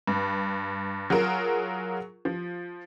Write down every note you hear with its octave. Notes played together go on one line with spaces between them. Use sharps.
G2
F#3 F4 G#4 A#4
F3